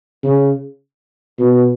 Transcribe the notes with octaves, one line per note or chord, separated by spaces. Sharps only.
C#3
B2